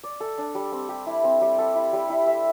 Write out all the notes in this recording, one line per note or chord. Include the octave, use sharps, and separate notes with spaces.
D5
A4
D4
G3
C4
G4
E4
C4
G3
A4
E4
G3
E4
E5